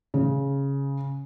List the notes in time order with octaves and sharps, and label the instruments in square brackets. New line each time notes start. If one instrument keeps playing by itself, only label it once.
[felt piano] C#3